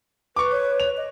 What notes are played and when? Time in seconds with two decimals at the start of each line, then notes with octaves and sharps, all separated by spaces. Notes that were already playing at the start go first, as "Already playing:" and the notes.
0.36 B4 C#6 D6
0.52 C#5
0.80 F7
0.97 D#5